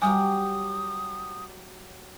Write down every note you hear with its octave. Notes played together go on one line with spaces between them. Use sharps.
F#3 G3 G4 G#5 D#6